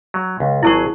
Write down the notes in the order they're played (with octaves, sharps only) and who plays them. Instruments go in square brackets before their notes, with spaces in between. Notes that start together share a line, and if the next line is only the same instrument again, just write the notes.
[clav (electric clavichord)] F#3
C#2
[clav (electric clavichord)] G#1 F#3 G#4 [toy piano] E4 A5 C#6